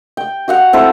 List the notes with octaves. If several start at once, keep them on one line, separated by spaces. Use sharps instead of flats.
G5
F#4 F5 F#5
C4 E4 A4